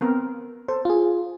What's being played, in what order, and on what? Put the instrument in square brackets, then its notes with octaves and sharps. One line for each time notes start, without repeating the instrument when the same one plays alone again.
[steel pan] B3 C4 A#4
[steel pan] A4 [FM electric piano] C5
[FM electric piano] F4 G#4